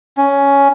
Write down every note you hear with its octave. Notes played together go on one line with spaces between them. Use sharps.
C#4